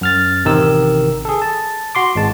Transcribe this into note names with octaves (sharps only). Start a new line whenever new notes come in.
F#2 F6 A6
A1 C3 D#3 A#4 E6
G#4 A4
A5
F#4 C6 D6
G#1 G#3 A5